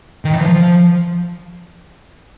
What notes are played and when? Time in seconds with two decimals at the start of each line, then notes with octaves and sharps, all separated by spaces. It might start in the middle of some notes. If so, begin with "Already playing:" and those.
0.25 D#3
0.33 E3
0.41 F3